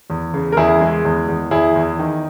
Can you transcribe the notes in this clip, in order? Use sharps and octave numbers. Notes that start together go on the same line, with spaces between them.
E2
C#3
A#4
E2 E4 G#4
G#3
E2
E2
E2 E4 G#4
E2
D#3